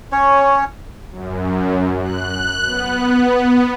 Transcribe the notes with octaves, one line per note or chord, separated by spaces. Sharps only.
C#4 C#5
F#2
F#6
B3